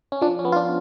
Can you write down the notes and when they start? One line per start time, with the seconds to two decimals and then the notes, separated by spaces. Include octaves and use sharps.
0.12 C#4
0.21 F3 D4
0.39 C#4
0.45 B3
0.52 F4
0.56 D4